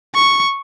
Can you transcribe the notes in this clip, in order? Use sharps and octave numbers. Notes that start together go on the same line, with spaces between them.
C#6